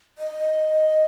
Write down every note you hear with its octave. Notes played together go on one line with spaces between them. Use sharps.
D#5